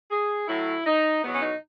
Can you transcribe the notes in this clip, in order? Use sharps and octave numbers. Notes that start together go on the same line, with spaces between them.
G#4
A2 F#3 E4
D#4
E2 B2 F#3 B3
C#4
D#4